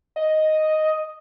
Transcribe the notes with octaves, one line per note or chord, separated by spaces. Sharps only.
D#5